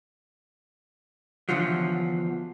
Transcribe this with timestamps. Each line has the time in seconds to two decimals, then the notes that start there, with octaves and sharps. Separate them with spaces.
1.49 E2 B2 D3 F3 F#3